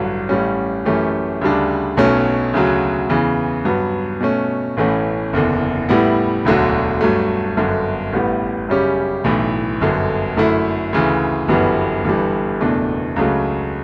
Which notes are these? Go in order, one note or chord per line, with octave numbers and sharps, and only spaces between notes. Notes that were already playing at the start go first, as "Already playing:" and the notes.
Already playing: A1 G2 D3 F#3
A1 A2 G3 C#4
F#2 E3 A3 C#4 G4
D2 C#3 G3 D4
B1 B2 F#3 A3 C#4
D2 C#3 F#3
E2 C#3 E3
G2 F#3 B3
B2 A3 C#4
A1 A2 E3 A3 C#4
F#1 E2 D3
A2 G3 B3 E4
E1 D2 D3 F#3
G2 F#3 A3
G1 F#2 D3
A1 A2 G3 B3
F#2 C#3 G3 C#4 G4
B1 A2 E3
G1 F#2 D3
F#2 D3 A3 E4
D2 C#3 E3
G1 F#2 E3 G3 B3
G1 G2 E3 G3
F#1 E2 B2 A3 D4
C#2 C#3 F#3 A3